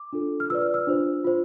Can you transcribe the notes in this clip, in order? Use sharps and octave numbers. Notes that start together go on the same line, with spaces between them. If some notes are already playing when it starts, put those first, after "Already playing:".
Already playing: D6
D4 F4 A4
F6
F4 B4 D5 E6
F6
E6
D4 F4 C5
F4 C5